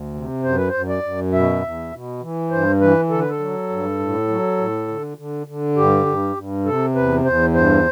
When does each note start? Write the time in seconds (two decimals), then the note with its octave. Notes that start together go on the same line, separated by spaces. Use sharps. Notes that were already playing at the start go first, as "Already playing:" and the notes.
Already playing: D2
0.14 C3
0.44 F#2 C5
0.56 B4
0.68 C5
0.73 F#2
0.89 D5
1.03 F#2
1.32 B2 E5
1.62 E2
1.92 B2
2.21 E3
2.51 G2 C5
2.80 E3 B4
3.10 D3 A4
3.20 B4
3.29 A4
3.39 F#3
3.70 G2
3.99 A2
4.28 F#3
4.58 A2
4.88 D3
5.17 D3
5.47 D3
5.76 G2 G4
6.06 G2
6.36 G2
6.65 C3 A4
6.95 E2 B4
7.24 E2 C5
7.54 G2 C5